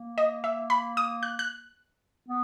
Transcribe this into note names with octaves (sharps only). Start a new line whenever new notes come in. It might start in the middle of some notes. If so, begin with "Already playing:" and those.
Already playing: A#3
D#5
E5
B5
D#6
F#6
F#6
B3